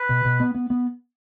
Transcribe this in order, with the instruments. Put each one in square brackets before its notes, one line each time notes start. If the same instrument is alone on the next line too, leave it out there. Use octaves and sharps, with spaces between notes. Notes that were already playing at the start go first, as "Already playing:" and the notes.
Already playing: [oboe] B4
[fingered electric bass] B2
B2
B3
B3
B3